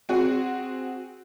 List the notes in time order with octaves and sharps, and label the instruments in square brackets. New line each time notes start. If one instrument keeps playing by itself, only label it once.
[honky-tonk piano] C4 F#4 G#4